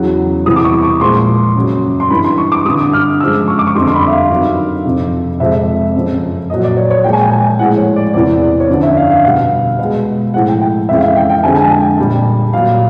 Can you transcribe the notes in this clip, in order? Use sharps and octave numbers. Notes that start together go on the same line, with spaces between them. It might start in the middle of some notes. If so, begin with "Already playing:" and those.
Already playing: E2 C#3 F#3
E2 C3 E3 G3 D#6
D6
C#6
C#6
A#2 F3 G#3 C6
F#2 C#3 F#3
C6
G2 E3 G3 B5
C6
C#6
D6
G2 D3 G3 D#6
F6
F#2 C#3 F3 G#3 E6
C#6
D6
C#6
F2 D3 G3 C6
C6
B5
E5
F5
G2 D#3 F#3
F2 C3 F3
F2 C3 F3 G#3 E5
F#2 C#3 F3
A#2 F#3 D#5
D5
C#5
C#5
A#2 F3 G#3 G5
G#5
G5
G#5
A2 F3 G#3 F#5
C#5
D5
E2 C3 E3 D5
D5
C#5
F#2 D3 F3 D5
E5
F5
F5
B2 G3 F#5
F5
B2 G#3
A2 F3 G#3 F#5
G5
G5
F2 C#3 E3 G#3 E5
F5
E5
G5
G5
F2 D3 F3 G#3 G#5
G#5
A5
G5
A#2 G3
A#2 F#3 F5